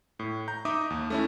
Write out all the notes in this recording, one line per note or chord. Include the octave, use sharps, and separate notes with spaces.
A2
A#5 G6
D#4 D#5 E5 D6 D#6
D#2
A3 C#4 E4